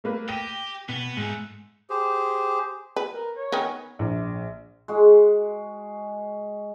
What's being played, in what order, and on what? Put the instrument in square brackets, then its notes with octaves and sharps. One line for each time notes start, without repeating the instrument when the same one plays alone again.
[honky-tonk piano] A3 A#3 B4
[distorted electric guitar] G4 [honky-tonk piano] G5 A#6 D#7
[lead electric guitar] B2 [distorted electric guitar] B3
[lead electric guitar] G#2 [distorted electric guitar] E3 A3
[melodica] G4 G#4 C5
[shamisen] B4
[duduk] A#4
C#5
[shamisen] D#3 B3 C#4
[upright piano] A#1
[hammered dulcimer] G#3 F#4